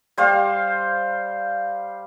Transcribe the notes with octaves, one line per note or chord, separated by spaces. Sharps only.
G3 C5 F5